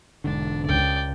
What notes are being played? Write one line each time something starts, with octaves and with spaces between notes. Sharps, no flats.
E1 G#2 D3 D4
C#2 D5 G5